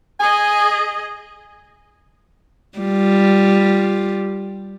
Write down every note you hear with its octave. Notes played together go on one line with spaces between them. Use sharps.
G#4 D#5 G#5
G3 F4